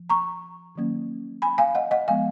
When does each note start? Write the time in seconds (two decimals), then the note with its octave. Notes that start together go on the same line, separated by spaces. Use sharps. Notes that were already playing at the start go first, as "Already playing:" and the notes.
Already playing: F3
0.10 A#5 C#6
0.75 D#3 F#3 A#3 C#4
1.42 G#5 B5
1.58 F5 G#5
1.75 D#5 F#5
1.91 D#5 F#5
2.08 F3 G#3 B3 F5 G#5